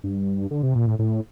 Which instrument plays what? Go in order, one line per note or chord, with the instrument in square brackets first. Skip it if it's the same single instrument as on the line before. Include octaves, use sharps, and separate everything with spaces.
[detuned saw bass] G2
D3
C3
A#2
A2
A2